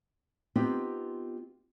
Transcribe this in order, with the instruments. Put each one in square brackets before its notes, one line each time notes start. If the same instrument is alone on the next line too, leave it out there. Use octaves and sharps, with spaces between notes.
[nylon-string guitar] B3 C4 D#4 F4 G4